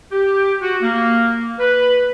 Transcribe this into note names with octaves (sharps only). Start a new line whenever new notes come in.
G4
F#4
A#3
B4